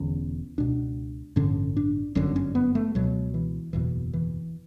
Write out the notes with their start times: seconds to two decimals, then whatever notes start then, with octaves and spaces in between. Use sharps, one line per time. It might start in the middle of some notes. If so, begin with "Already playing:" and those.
Already playing: E1 E2 D3 C#4
0.58 C#2 B2 D4
1.36 A1 G2 D3 C#4
1.77 D4
2.15 G1 F#2 D3 C#4
2.36 C#4
2.55 B3
2.75 A3
2.95 C#2 B2 F#3
3.34 E3
3.73 F#1 E2 B2 E3
4.13 E3